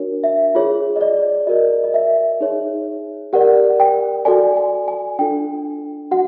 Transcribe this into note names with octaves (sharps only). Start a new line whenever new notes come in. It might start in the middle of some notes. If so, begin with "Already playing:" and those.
Already playing: D4 F#4 A#4 C#5
E5
F4 G#4 C#5
D#5
D5
F#4 A#4 D5 D#5
D#5
E5
D#4 G#4 C#5
G4 A#4 D5 F#5
G5
F#4 A4 D5 G#5
G#5
G#5
D4 F4 A4 G5
F#4 F#5